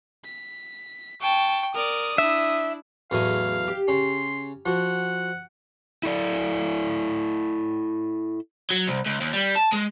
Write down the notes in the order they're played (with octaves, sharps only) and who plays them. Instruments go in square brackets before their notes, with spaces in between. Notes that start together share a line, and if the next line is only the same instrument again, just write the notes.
[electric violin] B6
[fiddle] G5 C#6 [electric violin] A5
[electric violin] A#4 D5 [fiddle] D#6
[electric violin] D4 E4 [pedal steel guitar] E5
[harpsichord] E2 F#3 A3 [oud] A2 G#4 [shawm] F5
[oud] G4
[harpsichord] C#3 C#4 [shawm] C6
[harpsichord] F3 F#4 [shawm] F#5
[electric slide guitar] E4 A4 D5
[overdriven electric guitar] F#3
C2
C#2
D#2
G3
A5
G#3